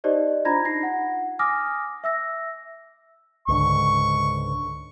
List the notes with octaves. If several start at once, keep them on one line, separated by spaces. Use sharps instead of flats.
D#4 G4 C5 D5 D#5
D4 F4 A#5 B5 G#6 A#6
D#4 A#6 C7
F#5
G#5 D6 D#6 F6 A#6
E5 E6 A#6
C#2 G#2 D3 C#6